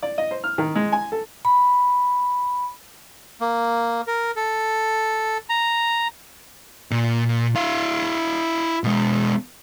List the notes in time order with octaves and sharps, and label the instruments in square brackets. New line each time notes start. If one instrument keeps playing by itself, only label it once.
[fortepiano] D5
D#5
C5
F6
D#3
G#3
G#5
A4
[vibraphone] B5
[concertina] A#3
A#4
A4
A#5
[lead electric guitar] A#2
E4 F5
B2 G#3